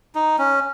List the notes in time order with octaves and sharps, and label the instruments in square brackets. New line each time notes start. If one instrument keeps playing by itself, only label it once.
[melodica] D#4
C#4